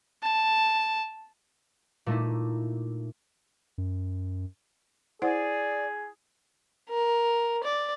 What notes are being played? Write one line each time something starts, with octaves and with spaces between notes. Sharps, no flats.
A5
A#2 A3 D#4 E4
F#2
E4 G#4 C5 D5 F#5
A#4
D5